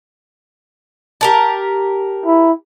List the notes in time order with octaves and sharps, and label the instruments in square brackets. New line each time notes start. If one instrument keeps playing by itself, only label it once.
[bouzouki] G4 A#4 A5
[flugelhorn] E4